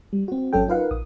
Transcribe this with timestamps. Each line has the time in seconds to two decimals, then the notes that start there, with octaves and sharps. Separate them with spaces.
0.13 G3
0.28 C4 F#4
0.53 G#1 F#3 C#4 A4 G5
0.68 D#4 F4 A#4 B4 F5 F#5
0.90 A#1 D#6